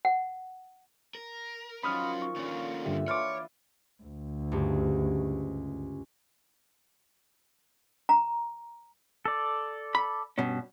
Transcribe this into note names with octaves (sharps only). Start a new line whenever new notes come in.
F#5
A#4
D#3 F3 F#3 C#4 B5 D#6 F6
C#6
A#2 D3 D#3 C#4
G2 D3 G4 E5
E3 F4 C#5 D6 F6
D2
C#2 G2
A#5
A4 D5
B5
G2 B2 C#4